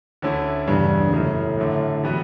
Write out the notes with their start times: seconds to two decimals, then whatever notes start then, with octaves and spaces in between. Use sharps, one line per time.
0.22 D2 D3 A3 C#4 E4
0.67 E2 G2 C#3 E3
1.12 F#2 A2 C#3 F#3
1.57 F#2 D3 A3
2.04 E3 G3 B3 F#4